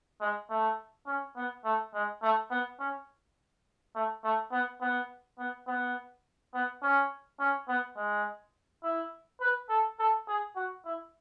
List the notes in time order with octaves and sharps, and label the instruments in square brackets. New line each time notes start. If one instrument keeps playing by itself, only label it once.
[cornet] G#3
A3
C#4
B3
A3
G#3
A3
B3
C#4
A3
A3
B3
B3
B3
B3
B3
C#4
C#4
B3
G#3
E4
B4
A4
A4
G#4
F#4
E4